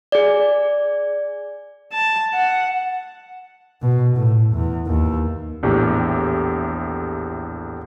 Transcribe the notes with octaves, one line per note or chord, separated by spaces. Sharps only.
G#4 D5
A5
F#5
B2
A2
E2
D#2
A#1 E2 A2 G4